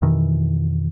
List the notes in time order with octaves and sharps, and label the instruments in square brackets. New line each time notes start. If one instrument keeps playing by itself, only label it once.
[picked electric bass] F2 B2 D#3 E3